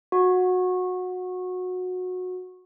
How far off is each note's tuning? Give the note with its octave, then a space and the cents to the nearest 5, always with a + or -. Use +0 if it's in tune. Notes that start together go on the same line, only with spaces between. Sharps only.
F#4 -20